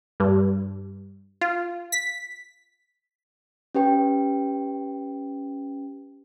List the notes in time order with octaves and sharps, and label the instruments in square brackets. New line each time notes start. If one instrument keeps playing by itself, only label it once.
[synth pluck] G2
F4
B6
[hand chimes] C#4 G4 B4 G5